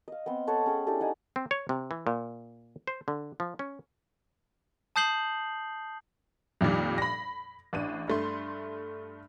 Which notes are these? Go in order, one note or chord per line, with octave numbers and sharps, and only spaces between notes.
D#5 F5
B3 C4 C6
A4 C#5 F#5 A5
C#4 G#4 G5
D4 E4 G4 A4
D#4 F#5 G#5
C4
C#5
C3
E3
A#2
C5
D3
F3
C#4
A5 D#6 G6 C7 F#7 G7
F2 A#2 D#3 G3
B5 A#6
A1 D4 D#7
G2 A3 C6